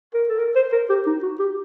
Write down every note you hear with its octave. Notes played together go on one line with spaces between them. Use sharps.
A#4
A4
A#4
C5
A#4
G4
D#4
F#4
G4